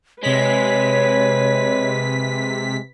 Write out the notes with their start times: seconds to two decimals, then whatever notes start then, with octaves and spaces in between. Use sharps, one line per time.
0.23 C3 G#3 B4 C#5 B6